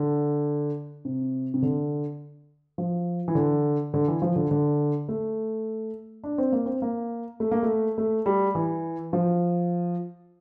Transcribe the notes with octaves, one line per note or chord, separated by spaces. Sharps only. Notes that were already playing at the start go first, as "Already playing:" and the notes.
Already playing: D3
C3
C3
D3
F3
E3
D3
D3
E3
F3
D3
D3
A3
D4
C4
A#3
C4
A#3
A3
A#3
A3
A3
G3
E3
F3